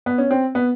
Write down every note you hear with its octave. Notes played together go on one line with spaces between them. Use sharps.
B3
C#4
C4
B3